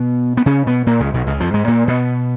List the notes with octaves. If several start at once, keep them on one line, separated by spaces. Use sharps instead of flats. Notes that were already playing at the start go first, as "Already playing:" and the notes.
Already playing: B2 B3
B3
C#3 C#4
B2 B3
A#2 A#3
C#2 C#3
B1 B2
C#2 C#3
F2 F3
G#2 G#3
A#2 A#3
B2 B3